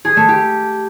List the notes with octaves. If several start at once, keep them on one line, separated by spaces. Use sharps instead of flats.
G#4
A3
G4